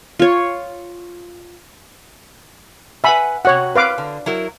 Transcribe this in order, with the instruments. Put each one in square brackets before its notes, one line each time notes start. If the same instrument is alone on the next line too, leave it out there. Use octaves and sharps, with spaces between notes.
[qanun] F4 C#5
[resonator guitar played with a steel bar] B4 F#5 G#5 [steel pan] E5 B5
[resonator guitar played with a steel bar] C3 F#4 [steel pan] C#5 F#5
[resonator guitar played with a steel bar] C4 [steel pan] B4 F5 D6
[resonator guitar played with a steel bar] D3
F#3 E4 A#4